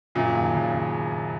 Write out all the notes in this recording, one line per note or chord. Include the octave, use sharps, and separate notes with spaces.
F#2 A#2 C#3
D#2
C#3
C#3